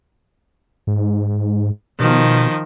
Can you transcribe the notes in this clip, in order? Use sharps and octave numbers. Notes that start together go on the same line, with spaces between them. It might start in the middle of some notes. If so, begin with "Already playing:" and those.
G#2
B2 D#3 F3